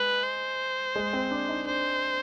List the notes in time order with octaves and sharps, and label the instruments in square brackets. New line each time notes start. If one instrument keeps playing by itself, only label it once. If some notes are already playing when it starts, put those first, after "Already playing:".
Already playing: [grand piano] G#3 [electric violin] B4
[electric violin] C5
[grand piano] G#3
C4
D4
D#4
[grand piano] D4 [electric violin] C5